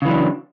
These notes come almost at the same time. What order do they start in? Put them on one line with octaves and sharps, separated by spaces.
C#3 E3 F#3 D4